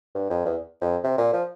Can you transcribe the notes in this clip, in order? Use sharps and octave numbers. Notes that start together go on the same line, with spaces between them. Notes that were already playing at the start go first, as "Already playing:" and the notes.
G2
F2
E2
F2
C3
A#2
F3